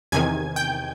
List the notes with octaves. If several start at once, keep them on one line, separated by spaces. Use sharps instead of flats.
E2 C3 D#3 G#5 G#6
G5 G6